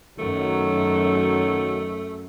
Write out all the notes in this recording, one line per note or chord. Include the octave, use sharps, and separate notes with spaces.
F#2 D#3 F#3 A3